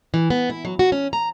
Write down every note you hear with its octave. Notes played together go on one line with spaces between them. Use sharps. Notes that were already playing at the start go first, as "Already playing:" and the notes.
E3
B3
E4
F#3
F#4
C#4
A#5